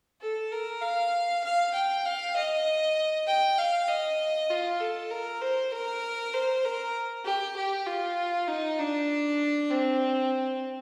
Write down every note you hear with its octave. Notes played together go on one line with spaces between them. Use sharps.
A4
A#4
F5
F5
G5
F5
D#5
G5
F5
D#5
F4
A4
A#4
C5
A#4
C5
A#4
G4
G4
F4
D#4
D4
C4